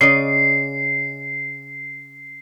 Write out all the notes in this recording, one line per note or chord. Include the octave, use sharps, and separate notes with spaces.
C#3 D5 D#5 C7